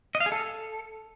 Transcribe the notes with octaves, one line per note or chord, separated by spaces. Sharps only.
D#5
F5
G#4
A4